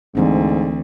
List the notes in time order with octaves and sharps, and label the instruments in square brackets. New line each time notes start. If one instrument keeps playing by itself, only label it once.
[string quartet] D2 [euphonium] G#2 [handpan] E3 C4 D4